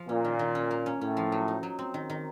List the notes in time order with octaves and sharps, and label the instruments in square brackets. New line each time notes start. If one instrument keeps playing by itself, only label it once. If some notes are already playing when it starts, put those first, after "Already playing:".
Already playing: [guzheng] F3
[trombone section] A#2 [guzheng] C#4
[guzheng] D#3
D#3
C#4
A#3
C#4
[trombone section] A2 [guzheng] C#4
[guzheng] F3
F#3
D#4
F#3
C4
D#3
D#3